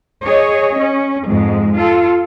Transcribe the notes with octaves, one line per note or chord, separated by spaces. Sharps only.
G#4 C#5 D#5
C#4
F2 G#2 G#3
F4 A4